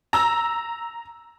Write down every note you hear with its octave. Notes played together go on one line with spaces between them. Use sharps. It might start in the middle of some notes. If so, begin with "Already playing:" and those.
A#5 E6